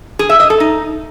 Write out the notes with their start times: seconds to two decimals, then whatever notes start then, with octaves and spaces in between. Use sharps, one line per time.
0.19 G#4
0.30 E5
0.40 D#5
0.50 A4
0.60 D#4